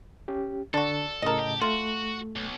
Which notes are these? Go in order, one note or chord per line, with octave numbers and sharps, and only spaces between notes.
C#4 G4
D3 D4 F#4 A4
A2 C#3 A#4 D#5 A5
G4
A3 F4 F#4
B1